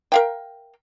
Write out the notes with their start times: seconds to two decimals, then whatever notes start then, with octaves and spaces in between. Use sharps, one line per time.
0.12 A#4 F5 G5